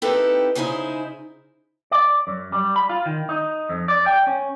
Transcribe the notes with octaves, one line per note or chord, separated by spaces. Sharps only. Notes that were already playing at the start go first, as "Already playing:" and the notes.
C4 D#4 E4 G4 A4 B4
C#3 D#4 E4 G#4 C5
D5
F#2
G3
B5
F4
D#3
D#4
F2
D5
G5
C#4